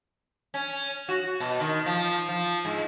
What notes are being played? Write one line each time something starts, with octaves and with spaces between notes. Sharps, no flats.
C#4
F#4
B2
D#3
F3
F3
G#2